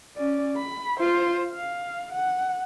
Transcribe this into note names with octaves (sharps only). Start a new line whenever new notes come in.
C#4 D5
B5
F4 C5
F5
F#5